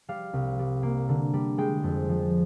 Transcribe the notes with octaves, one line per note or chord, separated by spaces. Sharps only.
G3 F5
C2
G3
A#3
D3
G3
G#3 G5
F2
F3